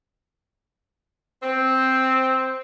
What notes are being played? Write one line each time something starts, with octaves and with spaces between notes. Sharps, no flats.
C4